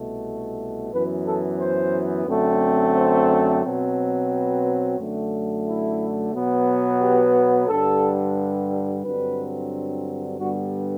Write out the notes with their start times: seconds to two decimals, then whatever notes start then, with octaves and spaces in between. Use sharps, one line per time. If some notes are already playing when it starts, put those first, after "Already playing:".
Already playing: C2 B2 A3
0.93 F#2 E3 B3 B4
1.27 A4
1.60 C5
2.28 F#2 D3 A3 C4
2.96 C5
3.63 B2 F#3 C4
4.31 B4
4.98 F#2 D3 A3
5.66 E4
6.33 B2 F#3 B3
7.01 G4
7.68 G2 D3 G3 A4
9.03 G2 D3 F#3 C4 B4
10.38 G2 D3 G3 B3 F#4